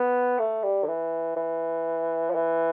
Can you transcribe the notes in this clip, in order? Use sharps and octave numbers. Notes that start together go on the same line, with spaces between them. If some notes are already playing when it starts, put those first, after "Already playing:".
Already playing: B3
A3
G3
D3
E3
E3
F3
E3